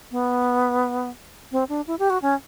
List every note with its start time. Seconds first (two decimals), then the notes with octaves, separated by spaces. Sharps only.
0.11 B3
1.52 C4
1.69 D4
1.87 E4
1.99 G4
2.10 F#4
2.22 C#4